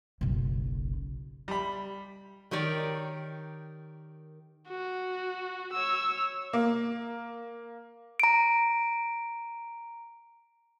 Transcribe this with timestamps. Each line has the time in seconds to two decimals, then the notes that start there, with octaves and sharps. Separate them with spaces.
0.21 F#1 B1
1.48 G3 B5
2.51 D#3 G4 A#4 C#5 D5
4.68 F#4
5.73 C#5 E6
6.53 A#3
8.20 A#5 D7